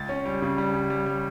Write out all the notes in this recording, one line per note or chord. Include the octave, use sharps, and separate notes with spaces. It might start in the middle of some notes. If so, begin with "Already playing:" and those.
Already playing: C#2 A6
C#4
G3
C#3
G3
C#3
G3
G3